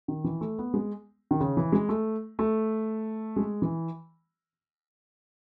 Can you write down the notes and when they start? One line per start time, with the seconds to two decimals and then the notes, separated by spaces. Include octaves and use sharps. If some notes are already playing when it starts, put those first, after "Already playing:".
0.08 D#3
0.24 E3
0.41 A3
0.58 B3
0.74 G#3
1.31 D#3
1.40 C#3
1.57 E3
1.72 G#3
1.89 A3
2.39 A3
3.36 G#3
3.62 E3